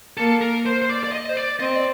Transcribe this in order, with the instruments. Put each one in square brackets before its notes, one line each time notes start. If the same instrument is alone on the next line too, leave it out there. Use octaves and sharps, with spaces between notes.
[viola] A#3 [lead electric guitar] A4
[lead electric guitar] A#4
C5
C5
D5
D5
D#5
C5
D5
[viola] C4 [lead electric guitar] D#5
[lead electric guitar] D5